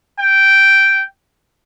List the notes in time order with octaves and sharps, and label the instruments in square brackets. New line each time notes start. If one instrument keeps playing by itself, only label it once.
[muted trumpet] G5